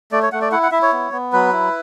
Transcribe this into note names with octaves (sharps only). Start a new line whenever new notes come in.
A3 D5
C#5
A3 F#5
D5
E4 F#5
F#5
E4 E5
C#5
B3
B3
F#3 B4
E4